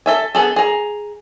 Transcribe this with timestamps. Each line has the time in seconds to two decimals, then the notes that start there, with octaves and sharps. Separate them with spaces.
0.06 A4 E5 G#5
0.35 B3 G#4 A4
0.56 G#4 A#5